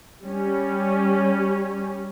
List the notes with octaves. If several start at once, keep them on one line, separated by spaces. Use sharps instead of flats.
G3 C#4